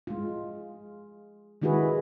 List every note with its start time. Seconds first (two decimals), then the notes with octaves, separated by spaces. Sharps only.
0.07 G#3 F4
1.62 D#3 G#3 E4 F#4 G#4 B4